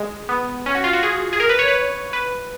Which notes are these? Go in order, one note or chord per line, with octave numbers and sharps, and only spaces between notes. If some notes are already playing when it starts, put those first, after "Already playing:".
Already playing: G#3
B3
C#4
F#4
F4
F#4
G#4
G#4
A#4
B4
C#5
B4
B4